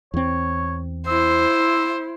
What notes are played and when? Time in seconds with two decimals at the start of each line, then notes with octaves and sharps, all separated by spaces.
0.14 E2 C4 C#5
1.07 E4 C5 E6